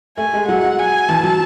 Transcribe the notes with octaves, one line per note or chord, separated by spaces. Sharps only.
A3 G#5
G#3
F#3 F#5
G#5
E3 A5
F#3